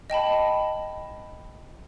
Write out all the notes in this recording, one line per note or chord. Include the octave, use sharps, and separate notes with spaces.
D#5 G5 A5 B5